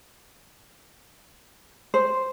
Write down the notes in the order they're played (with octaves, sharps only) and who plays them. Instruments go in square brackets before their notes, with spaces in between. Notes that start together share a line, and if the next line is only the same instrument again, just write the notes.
[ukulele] C5